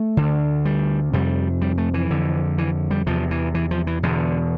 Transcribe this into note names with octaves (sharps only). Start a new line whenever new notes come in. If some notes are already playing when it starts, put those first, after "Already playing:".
Already playing: A3
D2 D3
G3
F2 C3 G3
G3
A3
E3
F2 D3
E3
G3
E2 C3 F3
E3
E3
F3
E3
E2 B2 D3